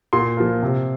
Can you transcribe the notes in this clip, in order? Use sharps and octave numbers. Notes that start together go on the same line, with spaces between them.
A#2 C6
F3 A#3
C3